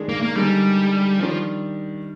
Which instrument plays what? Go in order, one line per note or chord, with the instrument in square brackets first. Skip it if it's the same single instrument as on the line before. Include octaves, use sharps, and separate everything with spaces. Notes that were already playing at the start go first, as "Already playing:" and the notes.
Already playing: [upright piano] D#3 G#3 D4 G#4
[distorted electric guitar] A#3
A#3
[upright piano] D3 G#3 D#4 A#4 [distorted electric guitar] G3
[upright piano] D#3 G3 D4 [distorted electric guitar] F3